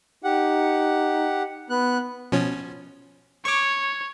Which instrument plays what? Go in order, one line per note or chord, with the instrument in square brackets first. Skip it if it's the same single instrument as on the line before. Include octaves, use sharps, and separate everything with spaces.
[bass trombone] D#4 [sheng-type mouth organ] G4 F#5
[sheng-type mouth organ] B3 F#6
[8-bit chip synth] B2 F3 C#4
[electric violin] C#5 [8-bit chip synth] C#6 D6